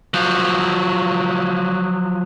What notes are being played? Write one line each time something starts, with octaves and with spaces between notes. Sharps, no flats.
F3 F#3